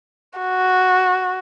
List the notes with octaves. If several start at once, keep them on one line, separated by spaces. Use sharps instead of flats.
F#4